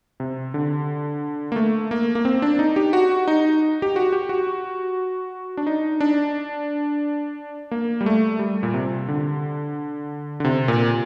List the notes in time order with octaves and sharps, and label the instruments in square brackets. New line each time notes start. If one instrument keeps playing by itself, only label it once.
[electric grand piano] C3
D3
A#3
A3
A#3
A#3
C4
D4
D#4
G4
F#4
D#4
G4
F#4
G4
F#4
D4
D#4
D4
A#3
G3
A3
G3
A#2
C3
D3
D3
C3
A#2